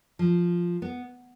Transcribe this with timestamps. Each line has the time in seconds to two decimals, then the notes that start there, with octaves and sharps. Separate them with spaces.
0.19 F3
0.82 B3